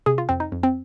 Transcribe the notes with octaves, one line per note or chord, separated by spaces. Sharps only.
C3 G#4
F4
F2 C4
D#4
F2
C4